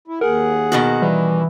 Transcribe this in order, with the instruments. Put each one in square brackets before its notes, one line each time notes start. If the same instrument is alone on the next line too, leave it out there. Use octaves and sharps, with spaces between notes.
[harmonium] E4
[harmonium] D#2 G#4 F#5 [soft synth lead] A#4
[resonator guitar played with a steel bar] B2 D#3 F#4 [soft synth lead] B3
[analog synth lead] E3 [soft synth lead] G3